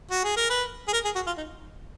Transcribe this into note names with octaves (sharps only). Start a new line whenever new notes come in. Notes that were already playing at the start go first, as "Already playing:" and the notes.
F#4
G#4
A#4
B4
G#4
A#4
G#4
F#4
F4
D#4